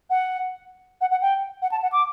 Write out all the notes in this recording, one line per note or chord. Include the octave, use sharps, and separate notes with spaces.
F#5
F#5
F#5
G5
F#5
A5
F#5
D6